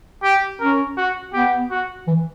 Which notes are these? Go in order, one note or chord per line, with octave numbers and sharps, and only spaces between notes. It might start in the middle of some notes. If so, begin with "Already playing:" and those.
G4
C#4 A#4
F#4
B3 G4
F#4
E3